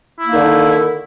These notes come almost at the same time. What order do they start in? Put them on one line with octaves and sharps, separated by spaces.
E4 A#3 D#4 D#3 D3